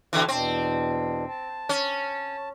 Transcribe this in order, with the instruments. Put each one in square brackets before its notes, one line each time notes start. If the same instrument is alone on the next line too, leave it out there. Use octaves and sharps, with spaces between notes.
[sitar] B2 D3 E3
[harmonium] E2 B2 D4 [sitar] C4
[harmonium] A5
[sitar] C#4